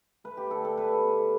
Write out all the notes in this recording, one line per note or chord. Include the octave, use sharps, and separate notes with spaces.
A3 B4
G4
D3 A4
A4
B3 B4
B3